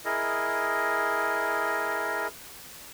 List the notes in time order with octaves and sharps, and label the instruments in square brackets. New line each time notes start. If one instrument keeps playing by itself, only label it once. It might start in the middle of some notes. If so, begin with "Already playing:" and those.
[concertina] E4 G#4 A#4 D#5